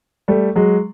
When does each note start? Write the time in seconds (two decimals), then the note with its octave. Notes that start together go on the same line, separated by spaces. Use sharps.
0.28 G3 A3
0.56 F#3 G#3